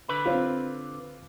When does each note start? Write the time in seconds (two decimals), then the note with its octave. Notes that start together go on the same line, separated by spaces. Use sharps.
0.09 D3 B4 B5
0.26 C4 F4